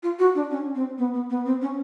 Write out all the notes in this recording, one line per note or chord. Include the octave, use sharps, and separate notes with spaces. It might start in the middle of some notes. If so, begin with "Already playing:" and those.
F4
F#4
D4
C#4
C4
B3
B3
B3
C4
C#4